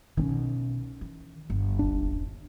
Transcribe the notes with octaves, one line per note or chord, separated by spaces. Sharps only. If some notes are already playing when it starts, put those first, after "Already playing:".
B1 D#3 C4 C#4
E3
G1
D#1 D4